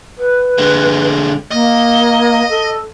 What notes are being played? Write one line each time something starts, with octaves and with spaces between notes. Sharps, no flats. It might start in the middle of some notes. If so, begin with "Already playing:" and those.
B4
D3 G#3
A#3 D#5
A4